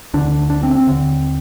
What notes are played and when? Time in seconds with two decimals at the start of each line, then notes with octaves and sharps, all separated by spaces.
0.14 D2 D3 D4
0.50 D4
0.63 C4
0.75 C4
0.87 D#2 D3